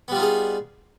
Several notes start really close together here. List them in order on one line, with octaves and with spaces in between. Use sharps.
B3 G3 F4 D#4 G#4